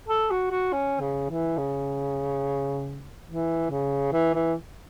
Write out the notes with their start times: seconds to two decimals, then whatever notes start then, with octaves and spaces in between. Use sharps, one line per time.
0.08 A4
0.31 F#4
0.51 F#4
0.73 C#4
1.01 C#3
1.30 E3
1.57 C#3
3.27 E3
3.70 C#3
4.13 E3
4.35 E3